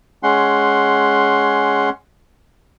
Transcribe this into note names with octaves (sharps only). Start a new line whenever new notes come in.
G#3 C#4 F#5 C6